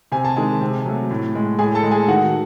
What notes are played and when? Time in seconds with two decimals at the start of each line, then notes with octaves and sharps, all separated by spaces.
0.12 C3 G#5
0.25 A5
0.36 D#3 G#3 G#4 G#5
0.61 C3
0.86 F#3 A3
1.11 A2
1.35 G#3
1.59 A2 G#4 G#5
1.75 A4 A5
1.83 G#3
1.91 G#4 G#5
2.08 D#3 F#4 F#5